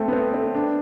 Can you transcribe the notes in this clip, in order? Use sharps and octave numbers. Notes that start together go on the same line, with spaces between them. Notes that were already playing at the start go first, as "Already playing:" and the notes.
Already playing: A3 C4
B3
C4
C4
D4